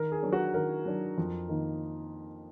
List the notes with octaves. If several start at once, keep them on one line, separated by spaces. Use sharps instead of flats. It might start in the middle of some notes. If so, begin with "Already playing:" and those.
Already playing: D#3 A#4
G#4
F#3 D4
F#4
D#3 A#4
F#3 D4
F2
D#3 A#3 D#4